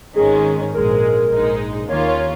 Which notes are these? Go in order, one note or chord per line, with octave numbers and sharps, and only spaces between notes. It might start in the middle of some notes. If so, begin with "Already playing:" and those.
G#1 G#2 D#3 G#3 C#4 G#4
A#1 G#2 G#3 A#4
A#1 G#2 G#3 D#4
D#2 D#3 A#3 C#4 F4 C#5
C#5
C#5